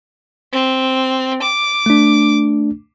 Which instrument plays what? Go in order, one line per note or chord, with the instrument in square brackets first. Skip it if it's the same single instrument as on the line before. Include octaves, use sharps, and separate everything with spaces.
[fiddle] C4
D6
[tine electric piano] A3 D4